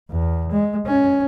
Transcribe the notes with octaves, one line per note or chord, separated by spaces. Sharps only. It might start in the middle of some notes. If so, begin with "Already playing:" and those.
E2
G#3
C#4